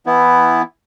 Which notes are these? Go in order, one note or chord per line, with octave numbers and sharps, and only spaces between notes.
E3 B3 E4